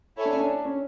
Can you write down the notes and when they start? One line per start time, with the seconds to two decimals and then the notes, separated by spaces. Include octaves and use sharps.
0.17 E4 A4 C#5 E5 G#5
0.25 D4
0.33 C#4
0.40 D4
0.65 C#4